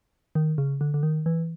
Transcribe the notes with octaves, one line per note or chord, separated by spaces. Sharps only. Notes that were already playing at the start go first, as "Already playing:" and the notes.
D#3
C#3
D3
D3
D#3
E3